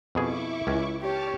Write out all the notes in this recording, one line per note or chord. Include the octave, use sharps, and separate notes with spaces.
F2 B2 E4 G#4 C#6 D6
C#2 C#4
G4 C#5 A5 D6 F6